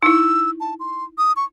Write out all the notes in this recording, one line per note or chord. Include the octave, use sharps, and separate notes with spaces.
D#4 E4 E6
A5
C6
D#6
C#6